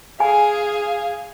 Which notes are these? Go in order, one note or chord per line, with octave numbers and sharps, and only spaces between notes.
G#4 F5 G#5